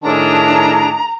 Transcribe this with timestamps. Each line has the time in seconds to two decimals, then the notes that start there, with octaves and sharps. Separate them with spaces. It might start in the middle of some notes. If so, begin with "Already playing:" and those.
0.03 A2 D#3 D4 G#4 C#5 A5 A#5